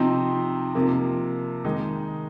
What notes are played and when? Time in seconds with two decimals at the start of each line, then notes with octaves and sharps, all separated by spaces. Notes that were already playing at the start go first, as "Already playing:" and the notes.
Already playing: C3 F3 C4 D#4
0.75 C3 F3 A#3
1.65 D#3 G#3 D#4